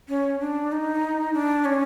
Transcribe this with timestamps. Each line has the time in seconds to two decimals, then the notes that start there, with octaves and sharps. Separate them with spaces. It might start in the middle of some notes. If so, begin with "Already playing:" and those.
0.09 C#4
0.40 D4
0.72 D#4
1.34 D4
1.65 C#4